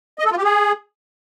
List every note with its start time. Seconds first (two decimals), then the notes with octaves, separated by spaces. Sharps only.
0.19 D#5
0.25 A4
0.31 F4
0.38 G4
0.44 G#4